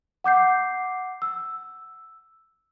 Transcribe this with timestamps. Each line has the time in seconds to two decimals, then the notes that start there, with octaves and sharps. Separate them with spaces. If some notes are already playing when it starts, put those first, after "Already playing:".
0.24 F#5 D6 G6 C7
1.22 E6